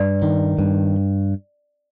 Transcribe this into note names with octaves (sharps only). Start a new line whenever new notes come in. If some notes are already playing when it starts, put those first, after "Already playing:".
Already playing: G2 D5
D#3
G2